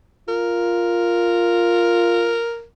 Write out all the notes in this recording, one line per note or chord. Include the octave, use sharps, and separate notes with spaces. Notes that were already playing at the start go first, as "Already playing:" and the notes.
F4 A#4